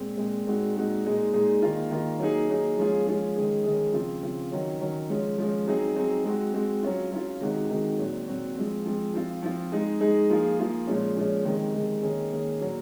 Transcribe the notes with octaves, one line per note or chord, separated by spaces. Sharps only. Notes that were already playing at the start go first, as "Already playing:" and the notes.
Already playing: A#2 G#3 C4
A#2 G#3 C4
A#2 G#3 C4 D#4 F#4
A#2 G#3 C4 D#4 F#4
A#2 G#3 D#4 G#4
A#2 G#3 D#4 G#4
D#3 A#3 F4
D#3 A#3 F4
F#3 A#3 D#4 G#4
F#3 A#3 D#4 G#4
F3 G#3 C#4 F4 G#4
F3 G#3 C#4 F4 G#4
D#3 G#3 C#4 G#4
D#3 G#3 C#4 G#4
C#3 F3 C4 F4
C#3 F3 C4 F4
D#3 F#3 C#4
D#3 F#3 C#4
F3 G#3 C#4
F3 G#3 C#4
F#3 C4 D#4 G#4
F#3 C4 D#4 G#4
G#3 C4 F#4
G#3 C4 F#4
F#3 C#4 F4
F#3 C#4 F4
C3 D#3 G#3 D#4 F#4
C3 D#3 G#3 D#4 F#4
A#2 F#3 C4 F#4
A#2 F#3 C4 F#4
F3 G#3 C4
F3 G#3 C4
F3 C4 F4
F3 C4 F4
G#3 D#4 G#4
G#3 D#4 G#4
F3 A#3 F4 G#4
F3 A#3 F4 G#4
A#2 F3 G#3 C#4
A#2 F3 G#3 C#4
C3 D#3 G#3
C3 D#3 G#3
D#3 A#3 C#4 G#4
D#3 A#3 C#4 G#4
A#2 F#3 A#3